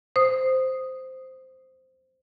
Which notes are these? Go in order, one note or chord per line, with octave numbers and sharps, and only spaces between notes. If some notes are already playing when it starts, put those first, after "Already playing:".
C5 D#6